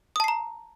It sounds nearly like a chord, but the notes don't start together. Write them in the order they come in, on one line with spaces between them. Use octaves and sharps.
D#6 A5 C7 A#5